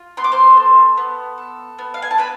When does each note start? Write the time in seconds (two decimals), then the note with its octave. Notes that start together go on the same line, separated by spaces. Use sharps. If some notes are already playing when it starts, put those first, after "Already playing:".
Already playing: F4
0.17 B3 C6
0.24 D6
0.32 C5 C6
0.57 A4
0.97 B3
1.38 A4
1.79 B3
1.94 F5
2.02 G#5
2.11 A5
2.18 D4 B4 B5